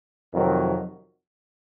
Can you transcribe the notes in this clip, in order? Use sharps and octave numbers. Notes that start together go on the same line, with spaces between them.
F2 C3 D#3 F#3